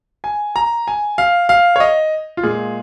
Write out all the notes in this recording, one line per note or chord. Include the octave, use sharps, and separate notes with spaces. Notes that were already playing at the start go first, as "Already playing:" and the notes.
G#5
A#5
G#5
F5
F5
C#5
D#5
F4
A#2 G#3 G#4